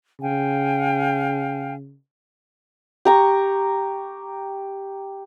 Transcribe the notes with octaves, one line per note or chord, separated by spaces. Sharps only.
C#3 F5 G5 G#5
G4 A#5 C#6